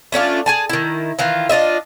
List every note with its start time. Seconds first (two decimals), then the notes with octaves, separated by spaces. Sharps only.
0.12 A3 C#4 D4 F4
0.46 G#4 G#5 A5
0.69 D#3 E4
1.19 D#3 E3 F4
1.49 D4 F4 D#5 E5